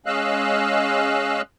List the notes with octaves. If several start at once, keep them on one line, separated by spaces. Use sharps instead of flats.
G#3 C#4 D#5 F5 E6 F#6